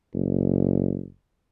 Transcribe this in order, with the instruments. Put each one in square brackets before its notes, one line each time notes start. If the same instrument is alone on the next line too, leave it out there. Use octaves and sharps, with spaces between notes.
[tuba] F#1